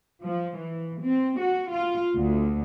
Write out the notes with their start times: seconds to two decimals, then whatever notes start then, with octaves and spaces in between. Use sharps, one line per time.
0.23 F3
0.58 E3
1.02 C4
1.40 F#4
1.71 F4
2.16 D2